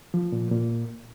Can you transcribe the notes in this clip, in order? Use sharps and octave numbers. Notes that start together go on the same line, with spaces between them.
F3
A#2
A#2